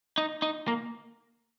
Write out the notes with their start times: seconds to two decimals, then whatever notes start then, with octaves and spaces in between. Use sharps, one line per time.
0.18 D#4
0.42 D#4
0.68 A#3